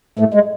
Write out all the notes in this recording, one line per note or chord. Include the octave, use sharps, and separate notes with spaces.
A2 A3
G#3